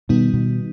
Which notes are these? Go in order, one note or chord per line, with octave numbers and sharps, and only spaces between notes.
B2 D#3 G3 B3 D#4
B2